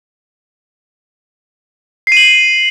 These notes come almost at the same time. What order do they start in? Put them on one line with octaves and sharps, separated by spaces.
C7 D#7 F#7